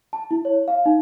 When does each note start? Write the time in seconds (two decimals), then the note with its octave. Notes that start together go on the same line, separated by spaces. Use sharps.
0.13 A5
0.31 E4
0.45 C#5
0.68 F5
0.86 D#4